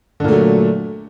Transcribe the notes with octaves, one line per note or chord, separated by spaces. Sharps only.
A#2 D3 F#3 A3